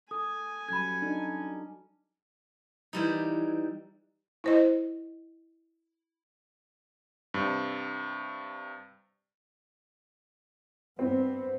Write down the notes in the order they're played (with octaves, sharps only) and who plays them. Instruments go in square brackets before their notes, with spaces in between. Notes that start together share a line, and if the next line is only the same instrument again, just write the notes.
[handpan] A4 [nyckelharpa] G#5 [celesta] D#6
[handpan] F#3 G3 A4 [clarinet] C#4 [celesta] B5 G#6
[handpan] D4 D#4 A4
[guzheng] E3 G3 D#4
[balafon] E4 C5 D#5
[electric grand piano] G2 C3
[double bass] G2 B3 [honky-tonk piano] C4